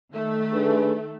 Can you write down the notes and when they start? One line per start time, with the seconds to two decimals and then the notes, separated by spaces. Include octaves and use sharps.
0.13 D#3 A3
0.52 D4 G#4 B4